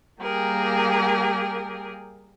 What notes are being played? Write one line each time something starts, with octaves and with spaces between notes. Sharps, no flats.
G3 A#3 G4 G#4 A#4